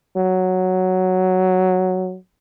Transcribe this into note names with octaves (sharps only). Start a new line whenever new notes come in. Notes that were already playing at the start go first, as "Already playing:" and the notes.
F#3